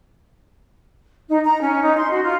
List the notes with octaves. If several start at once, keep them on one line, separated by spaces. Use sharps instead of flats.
D#4
A#5
C#4
D#4
C6
F#4
F4